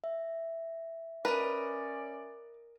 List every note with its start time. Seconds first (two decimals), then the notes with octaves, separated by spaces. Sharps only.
0.04 E5
1.25 C#4 A#4 B4 D5 D#5